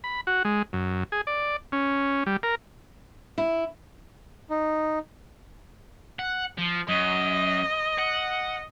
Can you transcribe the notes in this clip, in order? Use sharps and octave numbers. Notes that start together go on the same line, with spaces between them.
B5
F#4
G#3
F#2
G#4
D5
C#4
G3
A#4
E4
D#4
F#5
F3
F#2 D#5
F#5